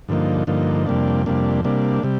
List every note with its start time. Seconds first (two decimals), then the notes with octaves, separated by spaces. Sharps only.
0.08 G2 D3 F3 A#3 D#4
0.47 G2 D3 F3 A#3 D#4
0.86 F2 C3 G3 A#3 D4
1.26 F2 C3 G3 A#3 D4
1.64 C3 G3 A#3 D4
2.03 C3 G3